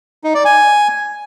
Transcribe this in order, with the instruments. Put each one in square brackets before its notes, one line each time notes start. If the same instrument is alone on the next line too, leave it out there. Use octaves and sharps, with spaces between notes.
[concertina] D#4
D5
G#5